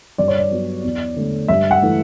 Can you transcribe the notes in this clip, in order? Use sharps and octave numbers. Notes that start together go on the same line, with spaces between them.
G2 D5
C#5
D5
F#3 B3
E2
D3 A3
G2 E5
F#5
E3 A3